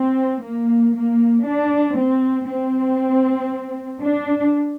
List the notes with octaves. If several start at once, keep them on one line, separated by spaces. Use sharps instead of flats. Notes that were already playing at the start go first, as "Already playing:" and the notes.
Already playing: C4
A#3
A#3
D4
C4
C4
D4